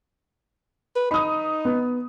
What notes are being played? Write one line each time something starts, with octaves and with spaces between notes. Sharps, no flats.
B4
D#4 B5 D#6
B3